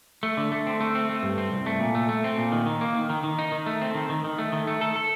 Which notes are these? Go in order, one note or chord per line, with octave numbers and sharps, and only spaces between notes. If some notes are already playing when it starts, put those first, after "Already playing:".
A3
D3
A3
C4
A3
C4
A3
G2
C4
C2
A3
A#2
A3
A3
C4
A#2
D#3
D#3
A#3
D#3
D#3
D#3
D#4
D#3
A3
C4
D#3
D#3
D#3
A3
D#3
A3
A4
A4